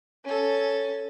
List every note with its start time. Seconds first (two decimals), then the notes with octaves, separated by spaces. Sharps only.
0.24 C#4 A4